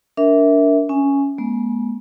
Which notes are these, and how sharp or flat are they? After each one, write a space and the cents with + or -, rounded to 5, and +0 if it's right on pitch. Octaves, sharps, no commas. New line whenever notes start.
D4 -25 A#4 +0 E5 -15
C#4 +5 G#5 +0
G#3 +20 B3 -40